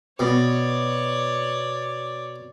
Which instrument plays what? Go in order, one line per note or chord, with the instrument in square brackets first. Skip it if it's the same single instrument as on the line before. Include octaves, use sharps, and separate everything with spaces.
[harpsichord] B2 [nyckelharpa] C#5 D5